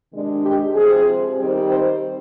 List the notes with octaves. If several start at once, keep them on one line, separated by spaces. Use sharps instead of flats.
C3 D#3 G#3 D4
G4
C3 F3 C4 G#4
D#3 G3 C4
C5